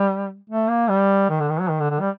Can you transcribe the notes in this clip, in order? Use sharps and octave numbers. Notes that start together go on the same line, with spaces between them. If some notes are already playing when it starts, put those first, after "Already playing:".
Already playing: G3
A3
A#3
G3
D#3
D3
D#3
F#3
D#3
D3
D3
G3